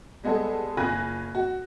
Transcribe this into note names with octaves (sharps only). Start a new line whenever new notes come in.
G3 G#3 B3 G#4 A4
F#1 F4 G#5 B5 F#6 A#6
F#4